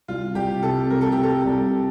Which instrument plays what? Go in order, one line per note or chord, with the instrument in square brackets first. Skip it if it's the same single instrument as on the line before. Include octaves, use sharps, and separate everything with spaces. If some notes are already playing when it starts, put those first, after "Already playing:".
[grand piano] C2 [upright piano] F4
[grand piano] C2 [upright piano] G4
[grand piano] C3 [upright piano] A4
[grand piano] C2 [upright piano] A#4
[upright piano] A4
G4
[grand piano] C3
[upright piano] A4
[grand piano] C2